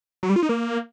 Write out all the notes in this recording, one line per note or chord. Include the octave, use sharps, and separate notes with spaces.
F#3
G3
F4
D#4
A#3